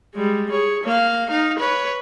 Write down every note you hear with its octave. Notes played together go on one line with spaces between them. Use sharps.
G3 G#3
G#4 C#5
A#3 F5
D#4 F5
B4 C#5